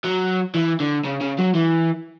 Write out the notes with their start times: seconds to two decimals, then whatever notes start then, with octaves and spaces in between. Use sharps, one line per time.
0.04 F#3
0.55 E3
0.80 D3
1.05 C#3
1.21 C#3
1.38 F#3
1.54 E3